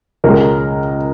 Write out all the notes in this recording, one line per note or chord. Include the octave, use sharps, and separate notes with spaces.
C#2 C#3 G#3 A#4